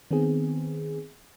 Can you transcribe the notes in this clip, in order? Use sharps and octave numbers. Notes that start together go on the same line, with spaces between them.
D#3 B3 C4 G#4